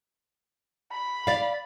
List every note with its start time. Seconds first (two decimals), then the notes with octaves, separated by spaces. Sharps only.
0.92 B5
1.27 D5 F5